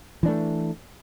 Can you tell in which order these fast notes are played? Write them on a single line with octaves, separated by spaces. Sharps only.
E3 D4 A3